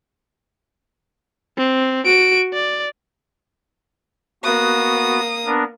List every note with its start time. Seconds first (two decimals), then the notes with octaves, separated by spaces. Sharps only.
1.58 C4
2.05 F#4 D7
2.53 D5
4.44 A#3 B3 F#4 D#6
5.46 B3 D4 A#4